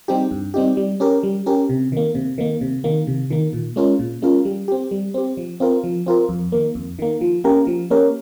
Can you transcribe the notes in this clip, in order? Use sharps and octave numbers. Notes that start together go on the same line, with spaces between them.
G3 C4 D#4 G4
G2
G3 C4 D#4 G4
G3
C#4 G4 A#4
G3
C#4 G4 A#4
C3
D#3 A#3
C3
D#3 A#3
C3
D#3 A#3
C3
D#3 A#3
A#2
G#3 C#4 F4 A#4
A#2
G#3 C#4 F4 A#4
G3
C4 G4
G3
C4 G4
F3
C4 F4 A#4
F3
C4 F4 A#4
F2
D#3 A#3
F2
D#3 A#3
F3
A#3 C#4 G4 A#4
F3
A#3 C#4 G4 A#4